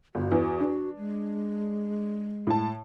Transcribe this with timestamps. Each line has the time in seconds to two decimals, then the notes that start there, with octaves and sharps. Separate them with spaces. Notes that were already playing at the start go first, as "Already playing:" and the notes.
0.15 G1 F#4
0.31 E2 E3
0.60 D4
0.97 G#3
2.47 A2 A5